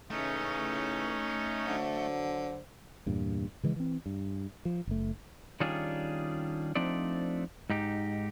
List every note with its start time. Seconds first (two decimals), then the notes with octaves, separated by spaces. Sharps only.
0.10 A2 C#3 E3 A3 C#4 D#4
1.67 D3 F#3 C5
3.06 E2 G2 A#2
3.63 C#3 E3 G#3
3.76 E3 C4
4.06 G2
4.65 F3
4.87 F#1 A3
5.60 D#3 G3 C#4 D4 F4 G#4
6.75 F3 A3 C4 D4 D#4 D5
7.70 G#2 D#4 G4